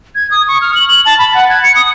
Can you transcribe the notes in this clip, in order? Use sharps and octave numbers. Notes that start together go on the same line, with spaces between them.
G#6
D#6
C#6
F6
F#7
F#7
A5
B5
F#5
G#6
C#7
D#6